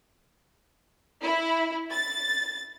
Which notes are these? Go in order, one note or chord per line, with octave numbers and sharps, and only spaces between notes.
E4
A6